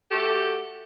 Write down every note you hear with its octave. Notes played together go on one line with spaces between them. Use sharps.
A3 F#4 G4 A4